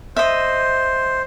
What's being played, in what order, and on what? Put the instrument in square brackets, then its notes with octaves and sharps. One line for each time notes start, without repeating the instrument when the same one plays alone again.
[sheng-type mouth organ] C5 [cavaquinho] D#5 E5